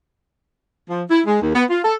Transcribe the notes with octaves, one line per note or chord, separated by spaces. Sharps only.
F3
E4
G#3
D#2
B3
F4
A4